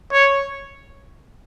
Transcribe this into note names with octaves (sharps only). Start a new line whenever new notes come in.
C#5